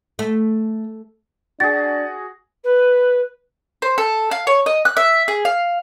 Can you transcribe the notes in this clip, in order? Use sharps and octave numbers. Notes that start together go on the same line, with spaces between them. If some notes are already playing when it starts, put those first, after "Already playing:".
A3
D4 F#4 G#4 A6
B4
C5
A4
F5
C#5
D#5
F#6
E5
G#4
F5